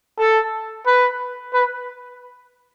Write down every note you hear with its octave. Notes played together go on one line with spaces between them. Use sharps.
A4
B4
B4